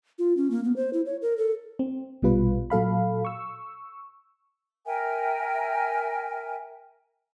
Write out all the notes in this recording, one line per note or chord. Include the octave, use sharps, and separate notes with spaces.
F4
C#4
A#3
B3
C5
E4
C#5
A#4
A4
C4
A#1 B2 G3 F4 B4
A#2 F#3 A4 F5 B5
C#6 E6
A#4 E5 G5 G#5